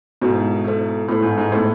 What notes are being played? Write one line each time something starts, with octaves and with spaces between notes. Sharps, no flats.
G#2 B2 B3 E4 A4 C5
B3 E4 A4 C5
A2 B3 E4 A4 C5
G#2
G#2
A2 B3 E4 A4 C5